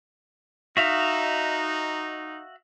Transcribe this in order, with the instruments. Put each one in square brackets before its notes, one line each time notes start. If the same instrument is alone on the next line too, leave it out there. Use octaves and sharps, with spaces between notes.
[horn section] D#4 [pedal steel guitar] F#4 E5 F5